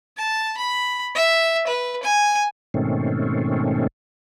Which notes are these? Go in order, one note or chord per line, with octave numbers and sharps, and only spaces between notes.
A5
B5
E5
B4
G#5
G#2 B2 D#3 A3 C4 C#4